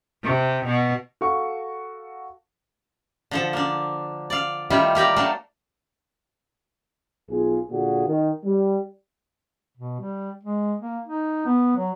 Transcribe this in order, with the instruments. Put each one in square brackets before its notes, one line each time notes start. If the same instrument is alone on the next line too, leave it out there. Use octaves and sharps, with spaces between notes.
[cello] C3
B2
[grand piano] F#4 A4 F5 C#6
[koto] D3 F3 A4
A#3 D4
D5 F5
D#3 G3 A3 E4 F4 G4
A#3 G4 A#4 D5
F#3 A3 A#3 D4
[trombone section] B1 F4 G#4
A#2 D3 A#3 F#4 G#4
D#3
G3
[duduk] B2
G3
G#3
A#3
D#4
B3
F#3